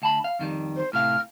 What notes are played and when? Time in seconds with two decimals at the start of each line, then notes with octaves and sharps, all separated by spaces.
0.02 D2 A5 B5
0.24 F5
0.39 F2 D#3 G3
0.76 C5
0.93 A2 C3 F5 F6